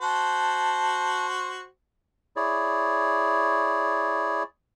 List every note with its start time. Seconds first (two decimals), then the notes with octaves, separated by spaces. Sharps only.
0.01 F#4 C5 A5
2.36 E4 G#4 C#5 D5